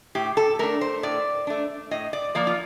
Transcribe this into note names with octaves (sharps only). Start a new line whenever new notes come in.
A2 G4
A4
A3 D4 A#4
C5
A2 D5
A3 D4
A2 D#5
D5
F3 A#3 D5
F4